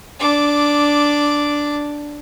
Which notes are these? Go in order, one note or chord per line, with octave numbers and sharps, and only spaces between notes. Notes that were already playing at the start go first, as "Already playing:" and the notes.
D4 D6